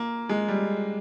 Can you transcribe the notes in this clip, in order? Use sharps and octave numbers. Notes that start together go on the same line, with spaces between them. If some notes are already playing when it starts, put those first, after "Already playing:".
Already playing: A#3
G#3
G3